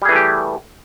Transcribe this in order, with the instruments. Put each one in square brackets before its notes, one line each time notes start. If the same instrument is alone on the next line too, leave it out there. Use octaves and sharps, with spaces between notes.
[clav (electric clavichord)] G3
G#4
E3
A3
G4